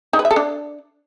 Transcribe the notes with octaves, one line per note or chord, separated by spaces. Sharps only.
D#4
B4
E5
A4
D4